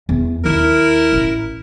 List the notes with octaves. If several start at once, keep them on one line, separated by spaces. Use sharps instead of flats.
E2
D#2 D#4 E4 A#4
A1